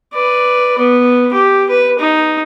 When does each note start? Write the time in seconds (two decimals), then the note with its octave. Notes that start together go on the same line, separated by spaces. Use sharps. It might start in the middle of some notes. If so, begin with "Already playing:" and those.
0.13 B4 D5
0.78 B3
1.33 G4
1.70 B4
1.99 D#4